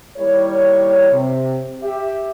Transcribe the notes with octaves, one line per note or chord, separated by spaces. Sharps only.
D#2 G3 E4 A#4 C#5
C3
G4 E5